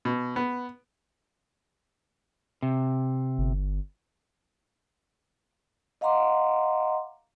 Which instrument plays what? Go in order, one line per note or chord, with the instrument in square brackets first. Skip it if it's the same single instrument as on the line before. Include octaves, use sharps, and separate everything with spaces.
[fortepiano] B2
B3
[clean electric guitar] C3
[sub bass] G1
[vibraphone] D#5 F5 F#5 A#5 C6 D6